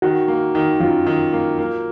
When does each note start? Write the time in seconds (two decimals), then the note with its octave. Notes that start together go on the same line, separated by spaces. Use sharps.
0.02 D#3 F#4
0.28 A#3
0.55 D#3
0.80 F#2 F4
1.07 D#3
1.33 A#3
1.59 A#3